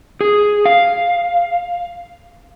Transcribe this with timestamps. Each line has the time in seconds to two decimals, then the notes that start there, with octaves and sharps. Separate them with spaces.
0.21 G#4
0.65 F5